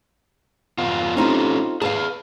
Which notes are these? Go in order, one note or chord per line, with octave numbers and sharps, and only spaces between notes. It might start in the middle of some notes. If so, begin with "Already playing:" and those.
F2 B3 F4
C4 C#4 D#4 F4 G4 A4
G#4 B4 F5 A5